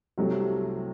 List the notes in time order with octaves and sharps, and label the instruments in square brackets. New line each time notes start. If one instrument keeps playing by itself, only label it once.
[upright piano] C2 C3 F#3 A3